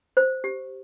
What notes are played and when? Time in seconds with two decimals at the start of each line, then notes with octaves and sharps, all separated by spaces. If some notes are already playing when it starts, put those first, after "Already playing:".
0.17 C5
0.44 G4